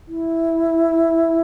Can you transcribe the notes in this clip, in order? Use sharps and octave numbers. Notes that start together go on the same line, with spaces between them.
E4